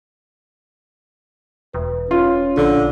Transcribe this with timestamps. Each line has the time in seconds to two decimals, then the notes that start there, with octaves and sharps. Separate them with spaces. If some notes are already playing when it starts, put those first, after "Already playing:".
1.74 E1 B4
2.11 C#4 F4
2.57 A#1 D3